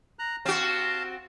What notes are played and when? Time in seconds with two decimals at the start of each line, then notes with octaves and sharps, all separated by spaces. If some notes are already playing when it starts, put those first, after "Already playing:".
0.19 A#5 F#6
0.45 C4 F#4 F5 A5